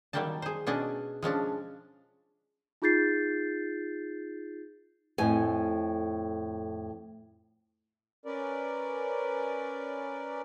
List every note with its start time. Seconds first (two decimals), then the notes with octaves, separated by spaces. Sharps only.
0.13 D#3 F#3 G3 A#3 G4 A5
0.42 G#4 C5
0.67 B2 C#4 D4 G#4 D#5
1.22 F3 G#3 C#4 D4
2.82 D#4 F4 G#4 G6 A6 C7
5.18 F2 A2 G#5
8.26 C#4 A#4 B4 D5